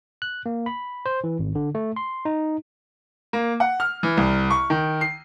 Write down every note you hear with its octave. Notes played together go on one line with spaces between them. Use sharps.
F#6
A#3
B5
C5
E3
G#1
D3
A3
C6
D#4
A#3
F#5
F6
E3
C2
C#6
D#3
C7